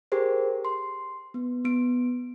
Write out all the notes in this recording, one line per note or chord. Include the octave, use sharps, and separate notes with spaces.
G4 G#4 A#4 C5
C6
B3
B3 D7